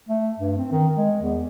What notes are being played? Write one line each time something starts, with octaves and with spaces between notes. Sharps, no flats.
A3
G2
C4
D#3
G#3
E2